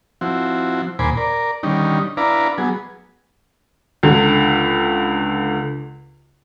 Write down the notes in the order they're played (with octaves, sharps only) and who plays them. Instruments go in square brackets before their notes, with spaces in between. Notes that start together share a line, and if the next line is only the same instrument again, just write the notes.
[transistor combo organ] F3 C4 E4 F#4
D#2 A#2 C5 G#5 B5 D6
A#4 D5
D3 D#3 G3 C#4 D#4
D4 E4 B4 D5 F5 A#5
F#3 B3 G#4
[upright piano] C#2 D3